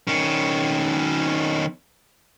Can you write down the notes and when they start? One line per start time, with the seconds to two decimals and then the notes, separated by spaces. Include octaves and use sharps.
0.07 D#3 C#4